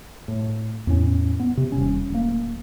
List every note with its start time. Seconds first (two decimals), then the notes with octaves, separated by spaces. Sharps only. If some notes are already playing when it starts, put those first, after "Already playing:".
0.28 A2
0.87 E2 A2 C#4
1.40 B3
1.57 C3
1.72 D#1 C#4
2.10 D1 A#3